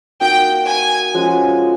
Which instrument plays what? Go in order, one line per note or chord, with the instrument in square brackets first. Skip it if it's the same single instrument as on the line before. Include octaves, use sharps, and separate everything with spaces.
[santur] A#3 D#4 F#4 [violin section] G5
[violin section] G#5
[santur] F3 G#3 C#4 F#4